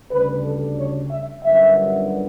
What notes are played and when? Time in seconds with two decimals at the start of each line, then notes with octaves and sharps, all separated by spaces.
0.11 D2 C#3 G3 D4 B4
0.44 A4
0.78 C#5
1.10 E5
1.43 G1 F#2 D3 G3 B3 E5